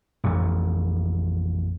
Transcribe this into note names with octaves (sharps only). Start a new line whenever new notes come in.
A1 F2 A3